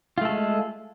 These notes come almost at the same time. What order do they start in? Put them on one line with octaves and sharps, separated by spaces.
F4 A3 A4 G#3